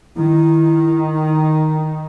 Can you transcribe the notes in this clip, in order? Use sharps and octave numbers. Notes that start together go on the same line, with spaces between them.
D#3 E4
D#4